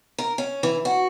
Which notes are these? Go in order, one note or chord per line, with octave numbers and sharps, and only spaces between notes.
A#4
C#4
E3
F#4